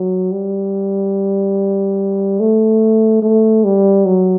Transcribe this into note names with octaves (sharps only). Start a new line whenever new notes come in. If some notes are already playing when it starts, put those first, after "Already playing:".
Already playing: F#3
G3
A3
A3
G3
F#3